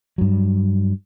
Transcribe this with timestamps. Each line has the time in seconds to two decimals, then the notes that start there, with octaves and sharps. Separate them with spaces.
0.18 G2 F#3